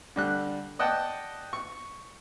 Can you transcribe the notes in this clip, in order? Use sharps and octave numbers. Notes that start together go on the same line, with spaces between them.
D3 G3 F#6
D5 D#5 F#5 G5 A5
C#6